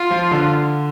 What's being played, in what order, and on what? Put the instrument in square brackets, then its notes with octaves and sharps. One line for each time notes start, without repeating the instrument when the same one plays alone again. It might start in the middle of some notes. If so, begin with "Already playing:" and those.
Already playing: [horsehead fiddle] F4
[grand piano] F3
D3